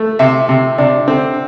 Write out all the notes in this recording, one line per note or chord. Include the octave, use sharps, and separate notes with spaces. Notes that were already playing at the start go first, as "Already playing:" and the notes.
Already playing: A3
C3 E5
C3
C3 D4
D3 C4